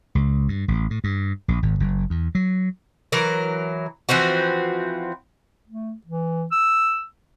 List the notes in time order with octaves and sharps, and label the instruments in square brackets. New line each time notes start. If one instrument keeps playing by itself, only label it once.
[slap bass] C#2
G2
A1
A2
G2
A#1
G#1
F#1
E2
F#3
[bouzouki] E3 F#3 A#4
E3 F3 C4 F#4
[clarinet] A3
E3
E6